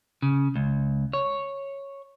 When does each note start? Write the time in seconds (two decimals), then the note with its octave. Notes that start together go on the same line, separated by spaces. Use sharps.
0.22 C#3
0.56 C#2
1.13 C#5